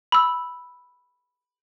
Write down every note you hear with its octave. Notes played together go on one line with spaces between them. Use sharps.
B5 E6